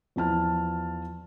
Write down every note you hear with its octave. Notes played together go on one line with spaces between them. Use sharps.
E2 F3 A5 F6